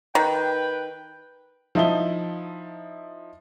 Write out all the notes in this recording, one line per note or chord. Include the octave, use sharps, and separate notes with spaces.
D#3 B4 G5
F3 D#4 E4 E5 A5 G7